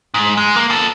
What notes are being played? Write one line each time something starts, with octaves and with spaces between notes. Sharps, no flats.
G#2
G#3
A#3
B3 A4